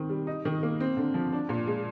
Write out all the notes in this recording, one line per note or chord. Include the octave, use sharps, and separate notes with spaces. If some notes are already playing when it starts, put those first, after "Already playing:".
Already playing: D#3 C4
G3
D#4
D#3
A#3
C4
D3
F3
D4
A#2
G#3